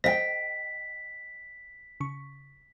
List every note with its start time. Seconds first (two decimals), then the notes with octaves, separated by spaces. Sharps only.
0.04 C5 D#5 F5 G5 B6
2.00 C#3 C#6